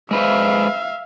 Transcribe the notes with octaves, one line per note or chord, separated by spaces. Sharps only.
G#3 B4 C5 E5 F5